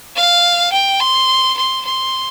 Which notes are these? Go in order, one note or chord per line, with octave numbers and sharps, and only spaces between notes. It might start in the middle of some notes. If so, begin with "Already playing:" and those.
F5
G5
C6
C6
C6